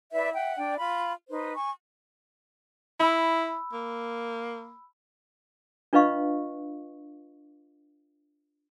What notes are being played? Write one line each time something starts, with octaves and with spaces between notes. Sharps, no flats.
E4 B4 D5 E5
E5 F#5 G5
D4 D5 G5
F4 B5
D#4 B4 C5
G#5 C#6
E4 B5 E6
A#3
D4 F4 B4 D#5 F5 C#6